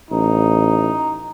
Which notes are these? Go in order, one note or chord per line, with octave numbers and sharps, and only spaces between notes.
A1 D#4